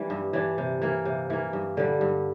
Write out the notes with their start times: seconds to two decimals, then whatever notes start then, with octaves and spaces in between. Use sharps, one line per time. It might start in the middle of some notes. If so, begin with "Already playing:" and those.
Already playing: E3 G3 A#3 D4
0.10 G2
0.33 E3 G3 D4
0.58 C3
0.82 E3 A#3
1.05 C3
1.30 E3 A#3
1.53 G2
1.77 D3 G3
2.01 G2